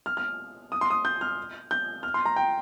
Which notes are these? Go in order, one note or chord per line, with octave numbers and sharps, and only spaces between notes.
F6
F6
D#6
C6
D#6
G6
F6
G6
F6
C6
A#5
G5